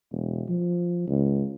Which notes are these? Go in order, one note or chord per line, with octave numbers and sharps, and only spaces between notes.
E1
F3
C#2